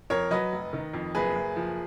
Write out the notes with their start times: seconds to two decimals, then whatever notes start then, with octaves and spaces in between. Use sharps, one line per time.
0.10 F2 A#4 C#5
0.31 F#3 B4 D#5
0.52 F1
0.73 D#3
0.93 F2
1.15 F#1 G#4 B4
1.35 F#1
1.56 F3